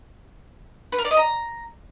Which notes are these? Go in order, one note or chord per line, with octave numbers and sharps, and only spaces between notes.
B4
A#4
D5
D#5
A#5